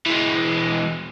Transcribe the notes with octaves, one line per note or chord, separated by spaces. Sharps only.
E3 G#3